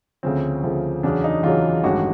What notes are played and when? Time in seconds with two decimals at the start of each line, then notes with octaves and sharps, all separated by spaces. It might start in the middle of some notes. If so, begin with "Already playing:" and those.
0.23 D2 C#3 F3 C4
0.64 D2 C#3 F3
1.03 E2 C#3 F#3 D4
1.24 D#4
1.43 E2 C#3 F#3 F4
1.84 A1 G2 D#3 G#3 F#4